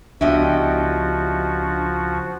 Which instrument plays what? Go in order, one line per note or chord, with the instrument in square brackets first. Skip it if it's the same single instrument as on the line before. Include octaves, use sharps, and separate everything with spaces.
[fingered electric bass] C#2 B3 [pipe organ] F3 F#4 [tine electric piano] D4 [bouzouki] E4 G4 D#5